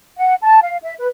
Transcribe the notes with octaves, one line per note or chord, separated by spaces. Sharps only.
F#5
A5
F5
E5
B4